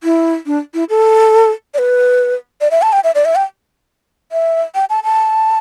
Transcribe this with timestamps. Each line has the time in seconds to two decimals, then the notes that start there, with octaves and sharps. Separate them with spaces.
0.03 E4
0.46 D4
0.74 E4
0.89 A4
1.74 D5
1.79 B4
2.61 D5
2.71 E5
2.82 A5
2.93 G5
3.04 E5
3.15 D5
3.25 E5
3.36 G5
4.32 E5
4.75 G5
4.90 A5
5.04 A5